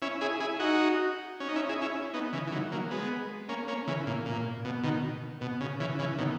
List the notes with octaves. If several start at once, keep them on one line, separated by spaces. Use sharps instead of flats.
C#4 E4
E4 G#4
E4 G#4
D#4 F#4
C#4
D#4
C#4 E4
E4 G#4
C#4 E4
B3 D#4
C#3 E3
E3
D#3 F#3
F#3 A#3
G#3 B3
A#3 C#4
A#3 C#4
C#3 E3
A#2
A#2
B2
B2 D#3
B2
C#3
C#3 E3
C#3 E3
B2 D#3